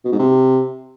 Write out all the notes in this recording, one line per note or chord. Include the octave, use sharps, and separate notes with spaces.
B2
G#2
C3